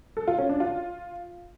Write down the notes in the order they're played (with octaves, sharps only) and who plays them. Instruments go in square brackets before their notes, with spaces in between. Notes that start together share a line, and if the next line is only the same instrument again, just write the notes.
[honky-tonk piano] A4
F4
C#4
D4
F4